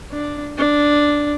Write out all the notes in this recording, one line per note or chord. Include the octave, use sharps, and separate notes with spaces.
D4
D4